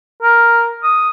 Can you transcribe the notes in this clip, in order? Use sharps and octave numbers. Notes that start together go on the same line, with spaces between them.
A#4
D#6